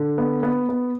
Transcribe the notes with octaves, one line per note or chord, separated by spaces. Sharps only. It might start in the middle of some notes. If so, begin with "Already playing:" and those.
Already playing: D3
B3
B3
B3